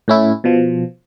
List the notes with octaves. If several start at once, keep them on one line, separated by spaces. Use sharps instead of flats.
A2 C#4 E4
B2 F3